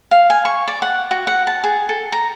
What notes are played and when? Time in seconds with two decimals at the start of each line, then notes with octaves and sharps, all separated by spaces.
0.11 F5
0.30 G#5
0.45 C#6
0.68 D5
0.82 F#5
1.11 F#4
1.27 F#5
1.47 A5
1.64 G#4
1.89 A4
2.12 A#5